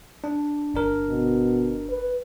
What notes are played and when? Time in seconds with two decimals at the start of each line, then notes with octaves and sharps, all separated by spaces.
0.24 D4
0.74 G1 D4 A#4
1.09 B2
1.89 B4